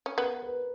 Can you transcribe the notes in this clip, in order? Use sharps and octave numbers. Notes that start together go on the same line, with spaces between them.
C#4
B3 A#4
B4